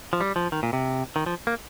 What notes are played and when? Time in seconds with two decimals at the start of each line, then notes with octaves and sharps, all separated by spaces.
0.13 F3
0.21 G3
0.36 F3
0.52 D#3
0.63 A#2
0.73 C3
1.16 D#3
1.26 F3
1.47 A#3